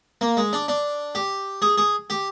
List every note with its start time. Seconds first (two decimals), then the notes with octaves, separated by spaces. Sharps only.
0.21 A#3
0.37 G#3
0.53 D4
0.68 D4
1.15 G4
1.62 G#4
1.78 G#4
2.10 G4